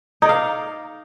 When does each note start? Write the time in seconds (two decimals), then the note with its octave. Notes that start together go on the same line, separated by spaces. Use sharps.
0.22 D#4
0.26 D5
0.29 F5